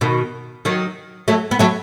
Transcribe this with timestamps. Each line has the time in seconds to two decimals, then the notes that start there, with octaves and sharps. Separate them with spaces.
0.01 B2 D#3
0.65 D#3 F#3
1.28 F#3 A3
1.51 B3
1.59 F#3 A3